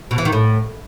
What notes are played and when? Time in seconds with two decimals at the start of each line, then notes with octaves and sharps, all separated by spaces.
0.11 B2
0.18 E3
0.25 D#3
0.32 A2